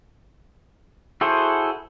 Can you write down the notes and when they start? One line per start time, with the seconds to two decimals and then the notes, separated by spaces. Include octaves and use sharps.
1.21 E4 F#4 G#4 A4 C5